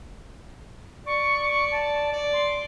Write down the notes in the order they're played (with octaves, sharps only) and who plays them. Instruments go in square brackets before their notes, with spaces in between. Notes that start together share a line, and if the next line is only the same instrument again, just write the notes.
[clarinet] D5 [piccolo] C#6
[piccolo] C#6
A5
[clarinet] D5
[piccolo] C6